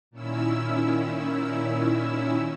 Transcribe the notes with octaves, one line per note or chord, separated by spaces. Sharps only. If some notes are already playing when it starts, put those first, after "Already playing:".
A#2 D#3 C#4 E4 E6